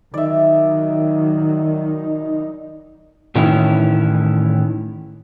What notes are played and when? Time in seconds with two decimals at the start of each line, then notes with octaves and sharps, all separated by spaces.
0.14 D#3 F#3 D#4 D5 E5
3.35 A2 D#3 E3 C#4 E4